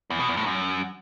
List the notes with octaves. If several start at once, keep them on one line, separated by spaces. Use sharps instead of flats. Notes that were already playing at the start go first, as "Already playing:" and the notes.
E2
B2
E2
A2
F#2